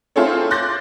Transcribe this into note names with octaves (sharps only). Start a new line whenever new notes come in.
C4 E4 F4 G#4 A4 C#5
C6 D6 F#6 G6 A6 A#6